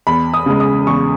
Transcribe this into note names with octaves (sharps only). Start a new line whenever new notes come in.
E2 B5
D#6
C#3 G#3
D#6
E2 C#6